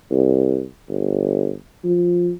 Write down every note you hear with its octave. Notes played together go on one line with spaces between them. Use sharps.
C2
G1
F3